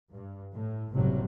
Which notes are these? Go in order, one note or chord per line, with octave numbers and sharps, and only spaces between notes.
G2
A2
F#1 A2 C3 F#3 G3